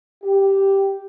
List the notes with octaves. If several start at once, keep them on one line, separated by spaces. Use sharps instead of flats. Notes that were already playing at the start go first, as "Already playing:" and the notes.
G4